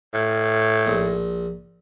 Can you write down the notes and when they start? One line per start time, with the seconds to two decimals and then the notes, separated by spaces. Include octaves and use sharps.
0.14 A2
0.86 A#1